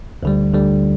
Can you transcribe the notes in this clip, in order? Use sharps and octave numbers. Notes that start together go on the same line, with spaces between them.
D2 D3 G3
D2 D3 G3